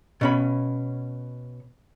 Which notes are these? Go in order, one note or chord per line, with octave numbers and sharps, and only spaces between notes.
B2 C#4 B5